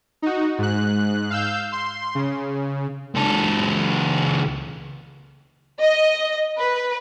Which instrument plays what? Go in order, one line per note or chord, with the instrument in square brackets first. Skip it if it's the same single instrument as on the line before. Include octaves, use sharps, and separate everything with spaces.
[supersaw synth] D#4 F#4
G#2 F#6
F5 E6 G6
C6
C#3
[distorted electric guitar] C#2 A4
[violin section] D#5
B4